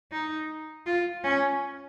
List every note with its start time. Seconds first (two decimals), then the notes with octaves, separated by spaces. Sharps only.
0.12 D#4
0.86 F4
1.24 C#4